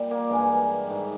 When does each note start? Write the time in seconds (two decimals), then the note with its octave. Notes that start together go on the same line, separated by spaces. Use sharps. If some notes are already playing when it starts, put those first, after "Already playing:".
Already playing: A#2 G3
0.11 A#3
0.29 G2 E3 G3 G#3
0.87 G#2 D#3 G3